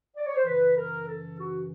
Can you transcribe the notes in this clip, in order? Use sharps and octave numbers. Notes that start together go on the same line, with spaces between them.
D5
C#5
C5
F#2 C#3 E3 B4
A#4
A4
F#4